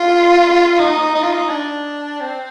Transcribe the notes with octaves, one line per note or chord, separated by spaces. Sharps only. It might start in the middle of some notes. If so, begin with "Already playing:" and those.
Already playing: F4
D#4
D#4
F4
D#4
D4
C4